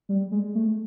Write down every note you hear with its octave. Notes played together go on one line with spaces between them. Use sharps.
G3
G#3
A3